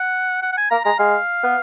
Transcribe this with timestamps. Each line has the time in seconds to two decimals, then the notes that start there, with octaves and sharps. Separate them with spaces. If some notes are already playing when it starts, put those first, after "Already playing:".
Already playing: F#5
0.42 F#5
0.52 F#5
0.58 G#5
0.71 A#3 A#5
0.85 G#3 A#5
0.99 G#3 F5
1.43 B3